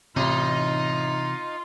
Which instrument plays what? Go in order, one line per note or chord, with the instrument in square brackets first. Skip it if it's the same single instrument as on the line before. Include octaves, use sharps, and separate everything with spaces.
[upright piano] A1 [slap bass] C3 E3 [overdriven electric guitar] D#4 [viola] F4